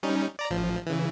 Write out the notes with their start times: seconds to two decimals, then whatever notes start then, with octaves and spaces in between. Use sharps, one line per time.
0.03 G3 C#4 D#4
0.39 D5 A#5
0.50 A1 F3
0.87 C#3 E3